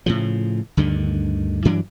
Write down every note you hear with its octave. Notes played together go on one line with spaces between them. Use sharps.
A2 C#3 F3
D2 G2 D3 D#3
G2 E3 F#3 D4